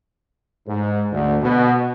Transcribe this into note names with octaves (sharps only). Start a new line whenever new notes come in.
G#2
D2
B2